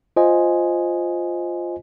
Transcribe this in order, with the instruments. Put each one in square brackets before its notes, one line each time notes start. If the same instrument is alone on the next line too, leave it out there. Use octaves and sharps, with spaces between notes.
[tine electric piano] F4 C5 D#5 G#5